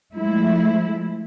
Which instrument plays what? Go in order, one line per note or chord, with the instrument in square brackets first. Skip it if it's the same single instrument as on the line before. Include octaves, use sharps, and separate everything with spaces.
[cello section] F3 G#3 A3 E4